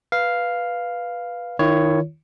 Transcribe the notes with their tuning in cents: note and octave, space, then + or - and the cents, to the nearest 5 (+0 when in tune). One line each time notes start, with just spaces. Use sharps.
B4 -10 F5 +0
D#3 +0 E4 +45 C#5 +5